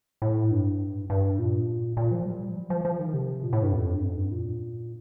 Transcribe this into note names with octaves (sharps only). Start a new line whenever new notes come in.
A2
G2
G2
A#2
A#2
F3
G3
F3
G3
F3
F3
D#3
C3
A#2
A2
G2
F2
G2
F2
G2
A#2